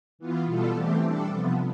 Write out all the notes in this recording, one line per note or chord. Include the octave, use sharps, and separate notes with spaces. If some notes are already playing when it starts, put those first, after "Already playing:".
E3 B3 F4
B2 G3 B3 F4 A4
E3 A3 C4 G4
G3 D4 A4
C3 F3 B3